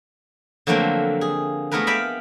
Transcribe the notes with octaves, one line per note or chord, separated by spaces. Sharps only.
D3 F3 F#3 A3 A#3 C4
G#4
G#3 A3 B3 E4 A#4 B4
D5 E5 F5 G5 G#5 B5